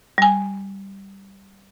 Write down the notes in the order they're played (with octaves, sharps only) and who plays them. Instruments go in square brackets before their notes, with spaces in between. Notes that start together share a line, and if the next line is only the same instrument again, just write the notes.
[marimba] G3 G#5